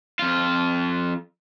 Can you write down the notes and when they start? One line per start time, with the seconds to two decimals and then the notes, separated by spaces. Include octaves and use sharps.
0.19 F2 F4